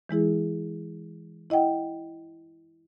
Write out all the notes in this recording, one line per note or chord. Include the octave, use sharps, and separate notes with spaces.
E3 G#3 E4 G#4
E4 D#5 F#5 G5